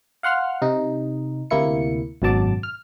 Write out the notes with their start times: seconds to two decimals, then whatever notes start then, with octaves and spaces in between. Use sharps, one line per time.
0.23 F5 F#5 C6 F6
0.62 C3 D#4
1.51 D2 C3 A#3 E4 C#7
2.22 G#1 F#2 B2 F#3 A5 D6
2.63 F6